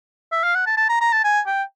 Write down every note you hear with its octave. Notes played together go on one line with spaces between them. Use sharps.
E5
F5
F#5
A5
A5
A#5
A#5
A5
G#5
G5